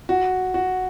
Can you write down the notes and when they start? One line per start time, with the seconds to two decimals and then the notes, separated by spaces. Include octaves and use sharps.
0.09 F#4
0.54 F#4